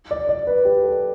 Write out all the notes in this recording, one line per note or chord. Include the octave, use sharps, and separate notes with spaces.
D5
D5
B4
G4
A4